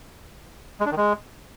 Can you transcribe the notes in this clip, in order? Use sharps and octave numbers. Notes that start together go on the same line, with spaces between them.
G#3
D4
D#3
G#3